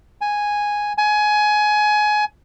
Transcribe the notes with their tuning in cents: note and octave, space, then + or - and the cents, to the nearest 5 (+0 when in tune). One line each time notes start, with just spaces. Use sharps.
G#5 -5
G#5 +20